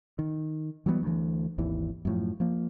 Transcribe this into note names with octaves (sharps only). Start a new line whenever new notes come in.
D#3
E3 F#3 G3 B3
D2 E3
G#1 D#2 E3
F#2 A2 F3
F3 A#3